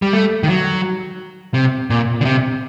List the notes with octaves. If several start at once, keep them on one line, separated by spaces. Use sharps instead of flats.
G3
A3
D#3
F#3
C3
A#2
D3
C3